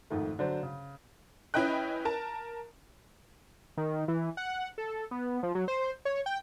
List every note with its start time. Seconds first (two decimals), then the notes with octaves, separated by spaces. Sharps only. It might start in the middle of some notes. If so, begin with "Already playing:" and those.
0.10 F2 G#2 D#3 A3
0.39 D3 F#3 D4 C5
0.63 C#3
1.54 C#4 E4 B4 D#5 G5 F#6
2.05 A#4 A5
3.77 D#3
4.08 E3
4.37 F#5
4.78 A4
5.11 B3
5.43 F3
5.55 F#3
5.68 C5
6.05 C#5
6.26 G5